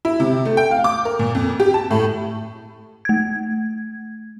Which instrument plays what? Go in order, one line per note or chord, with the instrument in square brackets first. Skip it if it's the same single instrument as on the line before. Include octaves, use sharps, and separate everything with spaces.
[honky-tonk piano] E4
C3
A3
G5
F5
D6
A#4
A#2
F2
G4
A5
A2
[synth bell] A3 G#6